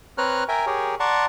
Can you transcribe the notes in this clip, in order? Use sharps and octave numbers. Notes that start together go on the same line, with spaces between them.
C4 B4 C#5 A#5 F6 F#6
A#4 E5 G5 G#5 A#5
G4 G#4 A#4 C#5
D5 F#5 A5 A#5 C6 C#6